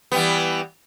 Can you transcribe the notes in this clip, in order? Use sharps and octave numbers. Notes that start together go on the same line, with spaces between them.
E3 G3 B3